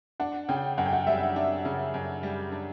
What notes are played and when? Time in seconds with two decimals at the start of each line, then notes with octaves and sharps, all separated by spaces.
0.20 D4 F#5
0.49 C#3 G5
0.78 F#2 F#5
0.86 G5
0.93 F#5
1.07 G3 E5
1.36 D4
1.65 C#3
1.94 F#2
2.23 G3
2.52 D4